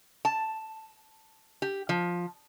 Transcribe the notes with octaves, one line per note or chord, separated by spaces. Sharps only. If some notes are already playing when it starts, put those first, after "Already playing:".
A5
G4
F3